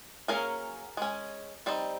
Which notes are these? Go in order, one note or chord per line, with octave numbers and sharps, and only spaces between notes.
F#3 A#3 C#4 G#4 A#4
G#3 C#4
G3 C4 D#4